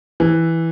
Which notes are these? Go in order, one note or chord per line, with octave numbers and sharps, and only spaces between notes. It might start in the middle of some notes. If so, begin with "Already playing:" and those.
E3